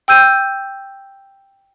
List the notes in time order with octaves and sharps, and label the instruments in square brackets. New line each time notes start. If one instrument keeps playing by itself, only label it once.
[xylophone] G5 E6 G6 D#7